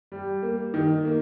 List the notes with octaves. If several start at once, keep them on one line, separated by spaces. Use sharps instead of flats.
G3
A#3
D#3
A#3